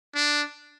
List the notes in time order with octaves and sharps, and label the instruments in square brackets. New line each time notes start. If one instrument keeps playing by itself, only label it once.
[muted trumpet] D4